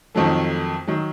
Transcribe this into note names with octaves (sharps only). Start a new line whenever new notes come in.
F2 D#3 F#3 A3
D#3 F#3